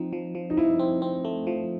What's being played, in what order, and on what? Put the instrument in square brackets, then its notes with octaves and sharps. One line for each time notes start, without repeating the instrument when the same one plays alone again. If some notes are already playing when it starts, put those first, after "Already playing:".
Already playing: [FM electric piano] F3 C4 [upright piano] D#4
[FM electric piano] F3
F3
[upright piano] D#4
[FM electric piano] F3 [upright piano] E4
[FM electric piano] C4
C4
A3
F3